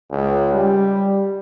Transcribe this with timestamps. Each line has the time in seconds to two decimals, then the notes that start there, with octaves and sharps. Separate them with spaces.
0.11 C#2
0.53 G3